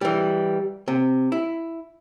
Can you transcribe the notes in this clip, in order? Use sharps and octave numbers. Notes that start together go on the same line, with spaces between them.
E3 G3
C3
E4